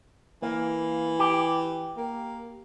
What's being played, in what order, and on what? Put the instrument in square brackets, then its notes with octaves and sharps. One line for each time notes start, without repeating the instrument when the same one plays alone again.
[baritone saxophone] E3 [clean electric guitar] A#3
[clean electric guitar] G4
[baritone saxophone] A#3